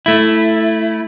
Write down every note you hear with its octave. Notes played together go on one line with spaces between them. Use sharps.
A3 E4